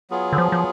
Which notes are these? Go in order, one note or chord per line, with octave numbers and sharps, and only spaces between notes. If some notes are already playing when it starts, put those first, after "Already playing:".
F#3 B3 F4 G#4
D3
F3
F3